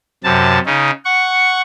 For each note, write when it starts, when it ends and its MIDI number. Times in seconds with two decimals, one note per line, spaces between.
0.24 0.59 42
0.24 0.59 48
0.24 0.59 81
0.66 0.91 49
0.66 0.91 61
0.66 0.91 63
1.05 1.62 78
1.05 1.62 85